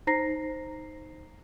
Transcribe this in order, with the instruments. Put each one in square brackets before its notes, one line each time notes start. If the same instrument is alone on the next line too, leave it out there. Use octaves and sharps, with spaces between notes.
[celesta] D#4 C5 A#5 A#6 C7